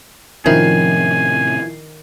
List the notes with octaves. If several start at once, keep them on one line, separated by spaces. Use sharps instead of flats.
A2 C3 D#3 F3 C#4 E4 G#5 C7